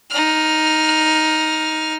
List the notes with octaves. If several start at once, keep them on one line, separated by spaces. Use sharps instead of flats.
D#4 F6